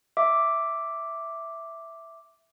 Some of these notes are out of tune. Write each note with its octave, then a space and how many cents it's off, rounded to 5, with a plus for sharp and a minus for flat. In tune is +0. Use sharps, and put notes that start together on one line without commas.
E5 +0 D6 +0